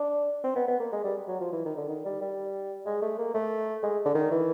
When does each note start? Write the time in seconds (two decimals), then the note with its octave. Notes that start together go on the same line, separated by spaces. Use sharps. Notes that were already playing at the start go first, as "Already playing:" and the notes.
Already playing: D4
0.44 C4
0.56 B3
0.68 B3
0.80 A#3
0.92 G#3
1.04 G3
1.28 F#3
1.40 F3
1.52 E3
1.65 D#3
1.77 D3
1.89 D#3
2.05 G3
2.21 G3
2.86 G#3
3.02 A3
3.18 A#3
3.34 A3
3.83 G#3
4.05 D3
4.15 D#3
4.31 E3